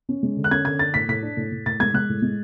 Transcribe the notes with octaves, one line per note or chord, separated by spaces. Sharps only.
C#4
G#3
D3
F#6
C#4 G#6
D3 G#6
D4 A6
A2 B6
A2 B6
D4
A2
A2
A2 A6
G#3 G#6
G#3 F#6
A2
G#3